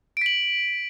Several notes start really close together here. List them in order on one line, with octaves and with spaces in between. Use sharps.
D7 B6 F#7